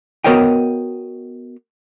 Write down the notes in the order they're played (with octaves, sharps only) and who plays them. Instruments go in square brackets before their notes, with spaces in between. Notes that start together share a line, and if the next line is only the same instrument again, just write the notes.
[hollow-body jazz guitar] B3 F#4 A#4 C#5 D#5 G5